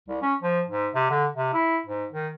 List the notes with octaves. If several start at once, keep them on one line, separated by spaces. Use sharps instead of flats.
C2
C#4
F3
G#2
C3
D3
C3
E4
G#2
D#3